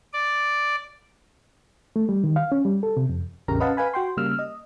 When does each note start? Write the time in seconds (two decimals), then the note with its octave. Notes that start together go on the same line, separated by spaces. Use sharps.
0.13 D5
1.96 A3
2.09 G3
2.24 D#3
2.36 F5
2.52 C#4
2.65 G3
2.83 A4
2.97 C3
3.09 F2
3.48 A1 E2 C#3 G4 A#4 A#5
3.60 C#4 B4 D#5 F5 F#5 A5
3.77 B4 F5 G#5 B5
3.94 F#4 G5 C6
4.17 C#3 G3 A#3 E6 F6
4.39 D#5